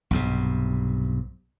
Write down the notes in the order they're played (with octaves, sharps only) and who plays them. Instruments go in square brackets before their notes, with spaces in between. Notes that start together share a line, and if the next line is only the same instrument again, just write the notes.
[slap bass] B1 G2 C3